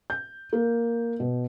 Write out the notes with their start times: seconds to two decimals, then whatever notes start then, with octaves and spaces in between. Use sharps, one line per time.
0.10 G6
0.53 A#3
1.20 B2